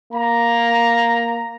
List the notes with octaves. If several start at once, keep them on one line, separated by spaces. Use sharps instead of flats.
A#3 A#5